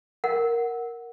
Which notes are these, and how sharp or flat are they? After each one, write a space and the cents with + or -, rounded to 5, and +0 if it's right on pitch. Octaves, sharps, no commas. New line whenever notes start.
A#4 +0 F#5 +0